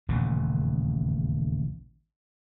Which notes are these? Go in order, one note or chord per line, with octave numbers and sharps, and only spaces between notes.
D#1 A1 E2 C#3